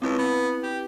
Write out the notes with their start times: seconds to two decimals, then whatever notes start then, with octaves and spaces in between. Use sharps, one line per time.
0.02 C#2 C4 E4 B4
0.18 B3
0.63 G4